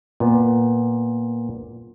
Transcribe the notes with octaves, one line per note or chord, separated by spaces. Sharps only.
A#2 B3